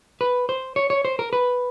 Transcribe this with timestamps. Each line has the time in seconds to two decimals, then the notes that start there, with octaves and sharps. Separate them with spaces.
0.21 B4
0.49 C5
0.76 C#5
0.90 C#5
1.05 C5
1.19 A#4
1.33 B4